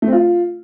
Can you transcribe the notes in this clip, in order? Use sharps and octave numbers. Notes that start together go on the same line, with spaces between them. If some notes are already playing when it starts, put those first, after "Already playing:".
A3
C4
F4